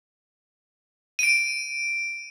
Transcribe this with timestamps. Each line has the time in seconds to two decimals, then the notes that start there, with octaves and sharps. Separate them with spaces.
1.19 D7 D#7